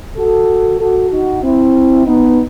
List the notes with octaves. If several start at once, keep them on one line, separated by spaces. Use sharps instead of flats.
F#4 A4
F#4 A4
D#4 F#4
C4 E4
B3 D#4